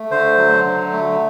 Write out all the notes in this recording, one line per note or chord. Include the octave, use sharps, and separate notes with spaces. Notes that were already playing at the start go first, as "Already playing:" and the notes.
Already playing: A3
D3 C5
F#3
D3
A3